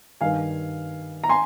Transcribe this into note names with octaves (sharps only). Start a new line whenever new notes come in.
G2 D#3 F5 G#5
A#5
G#5 C6